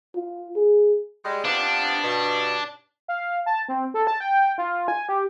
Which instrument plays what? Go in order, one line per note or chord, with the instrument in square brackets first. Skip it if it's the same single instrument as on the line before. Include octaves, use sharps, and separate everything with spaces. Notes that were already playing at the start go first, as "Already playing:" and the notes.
[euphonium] F4
G#4
[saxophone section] G3 G#3
[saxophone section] C3 F3 B3 [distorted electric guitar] D4
[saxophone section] G2 B2
[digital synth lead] F5
A5
C4
A4
A5
G5
F4
G#5
G4